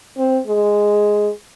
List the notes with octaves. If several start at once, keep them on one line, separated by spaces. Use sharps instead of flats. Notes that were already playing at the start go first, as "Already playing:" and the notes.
C4
G#3